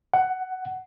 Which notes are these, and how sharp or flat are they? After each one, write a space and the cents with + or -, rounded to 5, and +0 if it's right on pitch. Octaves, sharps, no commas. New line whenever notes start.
F#5 +10